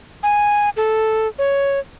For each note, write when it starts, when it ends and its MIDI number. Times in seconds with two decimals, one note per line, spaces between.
0.23 0.69 80
0.77 1.27 69
1.38 1.79 73